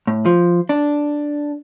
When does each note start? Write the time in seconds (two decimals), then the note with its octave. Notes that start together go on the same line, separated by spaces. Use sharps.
0.07 A2
0.26 F3
0.69 D4